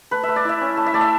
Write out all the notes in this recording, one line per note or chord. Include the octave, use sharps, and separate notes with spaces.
A3 B4
A3 E5
D5
E4 E5
C#4
A3
E5
A3 D5
E5